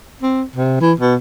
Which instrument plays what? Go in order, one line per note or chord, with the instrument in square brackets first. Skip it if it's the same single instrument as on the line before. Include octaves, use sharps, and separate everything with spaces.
[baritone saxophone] C4
C3
E3
B2